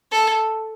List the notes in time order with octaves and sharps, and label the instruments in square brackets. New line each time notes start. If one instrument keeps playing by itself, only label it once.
[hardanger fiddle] A4